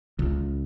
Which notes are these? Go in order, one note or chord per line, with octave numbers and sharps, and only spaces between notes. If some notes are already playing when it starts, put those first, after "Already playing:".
C#2